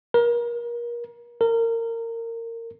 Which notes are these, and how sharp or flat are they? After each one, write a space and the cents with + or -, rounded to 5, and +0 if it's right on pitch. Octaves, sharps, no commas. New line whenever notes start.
A#4 +30
A#4 -25